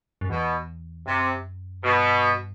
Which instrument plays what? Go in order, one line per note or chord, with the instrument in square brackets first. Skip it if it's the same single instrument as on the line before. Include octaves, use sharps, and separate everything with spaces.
[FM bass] F#2
[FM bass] E2 [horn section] B2
[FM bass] F#2 [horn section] C3
[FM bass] G2 [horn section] B2